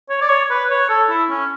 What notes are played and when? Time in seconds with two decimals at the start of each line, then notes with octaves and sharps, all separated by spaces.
0.10 C#5
0.21 D5
0.29 C#5
0.50 B4
0.70 C#5
0.89 A4
1.10 E4
1.30 C#4